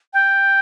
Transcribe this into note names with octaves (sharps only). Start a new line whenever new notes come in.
G5